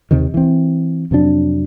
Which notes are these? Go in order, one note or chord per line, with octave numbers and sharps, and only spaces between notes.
D#2 C3 D#3
E3 C4
F2 C3 F#3 D4